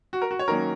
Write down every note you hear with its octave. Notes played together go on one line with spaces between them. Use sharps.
F#4
A#4
F#4
C#5
D#3 F#3 A#3 C#4 A#4